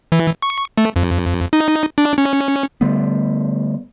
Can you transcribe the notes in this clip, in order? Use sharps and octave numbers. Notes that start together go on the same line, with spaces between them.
E3
C#6
A3
F2
D#4
D4
C#4
D3 G3 A3 B3